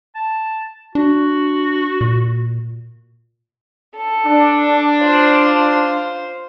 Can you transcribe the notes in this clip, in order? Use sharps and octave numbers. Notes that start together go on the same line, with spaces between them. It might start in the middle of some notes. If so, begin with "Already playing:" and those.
A5
D4 F#4
A#2
A4
D4
F4 C5